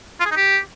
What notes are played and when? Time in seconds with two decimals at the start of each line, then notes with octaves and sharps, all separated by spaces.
0.20 F4
0.26 G#4
0.31 D#4
0.37 G4